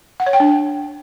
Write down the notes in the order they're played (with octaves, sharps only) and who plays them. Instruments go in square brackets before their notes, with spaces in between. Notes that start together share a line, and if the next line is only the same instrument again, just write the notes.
[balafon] F#5
C#5
G5
D4